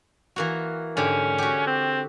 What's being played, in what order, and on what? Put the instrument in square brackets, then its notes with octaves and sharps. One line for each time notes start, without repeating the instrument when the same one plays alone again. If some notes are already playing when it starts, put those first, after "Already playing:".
[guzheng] E3 A#3 F#4
[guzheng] G#2 D3 G4 [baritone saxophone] C#4
[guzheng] F#4 G4
[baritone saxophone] C4